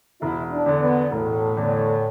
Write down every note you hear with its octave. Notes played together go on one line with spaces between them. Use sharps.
E1 E4
D4
E2 D3
B3
E1 A2
E2 D3